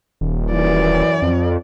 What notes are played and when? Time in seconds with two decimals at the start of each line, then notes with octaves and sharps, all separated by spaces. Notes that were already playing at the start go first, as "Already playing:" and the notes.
0.21 D#1
0.51 F#2 E3 D5
1.22 F2